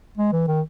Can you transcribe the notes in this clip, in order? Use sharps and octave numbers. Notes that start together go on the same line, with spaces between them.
G#3
E3
D#3